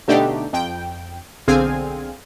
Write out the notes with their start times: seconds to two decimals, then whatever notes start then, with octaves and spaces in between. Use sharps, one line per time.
0.08 B2 D3 A3 D4 D#4 G4
0.53 F2 G5
1.48 B1 D3 C4 G#4 F5 G#5